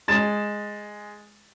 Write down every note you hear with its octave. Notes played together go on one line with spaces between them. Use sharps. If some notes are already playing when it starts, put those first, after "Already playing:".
G#3 A6 E7